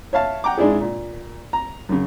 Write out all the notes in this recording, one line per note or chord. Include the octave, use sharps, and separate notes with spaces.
C#5 E5 F5 A5
F#5 G5 A#5 D6
G#2 G#3 D4 E4 G#4
A#2
A#5
F#2 C#3